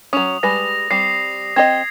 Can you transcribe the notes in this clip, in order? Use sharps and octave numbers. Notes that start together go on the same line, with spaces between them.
F#3 C#4 D#6 F7
G3 G#3 B4 A#6
G3 C4 C7
C4 G4 D#5 G#6